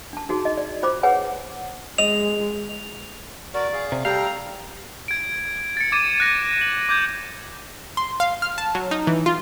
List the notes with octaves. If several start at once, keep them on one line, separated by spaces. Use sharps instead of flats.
D4 A5
D#4 F#4 G#4
D#5
D5
F4 C5 B5 D6
G#4 B4 C#5 F#5 G#5
G#3 D#5 F7
F#4 A#4 D5
G#4 F5
C3
G3 G4 A4 F5 G5 A#5
G#6 D7
A6 C#7
D6 G#6 A6 D#7 E7
F#6 A#6 D#7
F#7
D6 G6 G#6
C6
F5
F6
A5
F#3
D#4
E3
F4